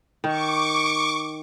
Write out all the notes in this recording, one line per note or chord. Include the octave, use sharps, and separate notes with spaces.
D#3 C#6 D6